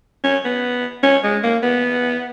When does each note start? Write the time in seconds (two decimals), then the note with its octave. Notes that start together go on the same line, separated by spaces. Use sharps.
0.24 C#4
0.45 B3
1.03 C#4
1.24 G#3
1.44 A#3
1.63 B3